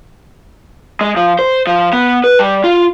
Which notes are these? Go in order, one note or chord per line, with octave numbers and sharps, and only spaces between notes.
G#3
F3
C5
F3
B3
B4
G3
F4